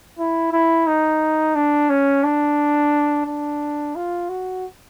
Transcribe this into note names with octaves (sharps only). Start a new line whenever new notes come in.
E4
E4
D#4
D4
C#4
D4
D4
F4
F#4